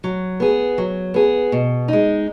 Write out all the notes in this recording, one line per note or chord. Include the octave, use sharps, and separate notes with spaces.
F#3
B3 G#4
F#3
B3 G#4
B2
G#3 D#4